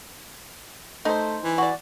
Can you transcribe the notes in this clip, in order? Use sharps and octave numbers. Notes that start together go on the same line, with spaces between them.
A3 D#4 C5
E3
F#4 D5